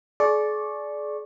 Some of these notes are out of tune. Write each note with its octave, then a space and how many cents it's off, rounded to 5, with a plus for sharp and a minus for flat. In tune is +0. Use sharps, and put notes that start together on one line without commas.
G#4 +40 D5 -5 C#6 -20